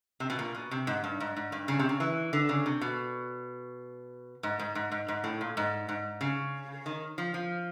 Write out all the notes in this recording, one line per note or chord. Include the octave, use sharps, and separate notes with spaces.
C3
B2
A#2
B2
C3
G#2
G2
G#2
G#2
G2
C#3
C3
C#3
E3
D3
C#3
C3
B2
G#2
G#2
G#2
G#2
G#2
A2
A#2
G#2
G#2
C#3
D#3
F3
F3